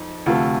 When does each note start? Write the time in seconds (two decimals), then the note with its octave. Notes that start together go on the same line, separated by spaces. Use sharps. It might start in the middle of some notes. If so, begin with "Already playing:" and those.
Already playing: F2 D#4
0.26 D2 C3 F3 A3 F4